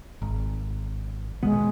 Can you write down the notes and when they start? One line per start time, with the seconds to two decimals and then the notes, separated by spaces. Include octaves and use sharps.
0.22 G#1
1.43 D#1 B2 G#3 B3